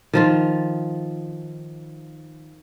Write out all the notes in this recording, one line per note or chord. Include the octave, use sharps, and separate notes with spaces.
D#3 F3 F4